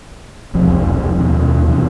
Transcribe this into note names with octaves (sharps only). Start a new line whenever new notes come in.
E1 C2 F2 F3
D#2 B2
D#2 C3 E3 C#4